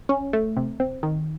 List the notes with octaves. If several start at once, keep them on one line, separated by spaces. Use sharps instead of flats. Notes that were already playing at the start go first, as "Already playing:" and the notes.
C#4
A3
C3
C4
D#3